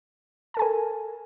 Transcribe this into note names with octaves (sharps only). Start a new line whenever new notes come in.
A4 A#4 G#5 A5